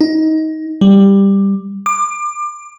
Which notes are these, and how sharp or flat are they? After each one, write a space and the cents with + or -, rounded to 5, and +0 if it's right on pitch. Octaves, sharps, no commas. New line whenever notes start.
D#4 +20
G3 +10
D6 +25